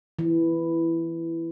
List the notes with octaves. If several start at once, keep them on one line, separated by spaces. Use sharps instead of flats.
E3